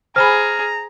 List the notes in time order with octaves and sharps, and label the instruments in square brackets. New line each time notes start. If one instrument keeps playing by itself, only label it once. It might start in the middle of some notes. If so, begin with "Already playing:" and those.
[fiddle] G#4 [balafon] C5 G#5 B5 [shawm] A#5 [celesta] F6